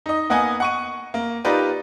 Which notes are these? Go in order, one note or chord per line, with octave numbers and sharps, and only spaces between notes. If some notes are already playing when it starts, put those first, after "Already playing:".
D#4 D#5
A#3 B3 D#5 F#5 G#5
F#5 C#6 D#7
A#3
D#4 F4 G4 A#4 B4 D5